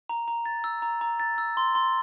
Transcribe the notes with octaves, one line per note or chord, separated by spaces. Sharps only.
A#5
A#5
A6
E6
A#5
A#5
A6
E6
C6
C6